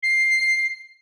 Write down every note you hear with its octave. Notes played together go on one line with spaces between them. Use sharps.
C7